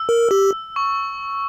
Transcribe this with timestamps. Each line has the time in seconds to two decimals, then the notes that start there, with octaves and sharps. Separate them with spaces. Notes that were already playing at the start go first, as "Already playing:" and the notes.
Already playing: E6
0.09 A#4
0.31 G4
0.76 C#6